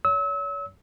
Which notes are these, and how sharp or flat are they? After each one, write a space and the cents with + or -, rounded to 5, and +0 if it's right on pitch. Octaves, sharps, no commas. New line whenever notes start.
C#5 +40 E6 -35